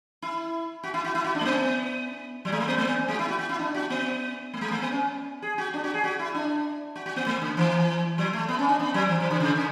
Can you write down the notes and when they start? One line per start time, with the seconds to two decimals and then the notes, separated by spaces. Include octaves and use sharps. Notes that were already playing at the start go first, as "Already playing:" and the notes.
0.22 E4
0.83 F#4
0.94 E4
1.04 F#4
1.15 E4
1.24 F#4
1.35 D4
1.41 A3
1.46 B3
2.45 F#3
2.52 G#3
2.60 A3
2.68 B3
2.78 A3
2.88 B3
3.08 G#3
3.14 F#4
3.19 E4
3.28 F#4
3.39 F#4
3.49 E4
3.59 D4
3.74 F#4
3.90 B3
4.54 A3
4.61 G#3
4.71 A3
4.82 B3
4.92 C#4
5.42 G#4
5.58 F#4
5.74 D4
5.84 F#4
5.94 G#4
6.04 F#4
6.19 E4
6.35 D4
6.96 F#4
7.06 F#4
7.16 B3
7.27 A3
7.42 D3
7.57 E3
8.18 F#3
8.33 A3
8.49 B3
8.59 C#4
8.69 D4
8.80 B3
8.94 F#3
9.09 E3
9.20 E3
9.31 D3
9.40 C#3
9.56 D3